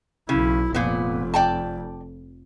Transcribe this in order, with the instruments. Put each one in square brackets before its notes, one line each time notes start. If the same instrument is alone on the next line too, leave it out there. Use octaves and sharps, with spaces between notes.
[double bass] B1 E4 [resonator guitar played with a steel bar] C#3
[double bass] F1 F2 [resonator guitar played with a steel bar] A#2 B3
[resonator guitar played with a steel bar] D5 G5 A5